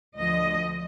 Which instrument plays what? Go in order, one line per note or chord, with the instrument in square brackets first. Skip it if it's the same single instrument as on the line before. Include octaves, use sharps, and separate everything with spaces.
[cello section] D2 D3 F3 D#5